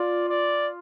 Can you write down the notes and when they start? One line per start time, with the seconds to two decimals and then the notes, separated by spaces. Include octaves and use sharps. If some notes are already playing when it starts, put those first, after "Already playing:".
Already playing: F4 D5
0.29 D5